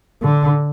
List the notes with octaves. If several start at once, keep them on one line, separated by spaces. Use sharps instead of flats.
D3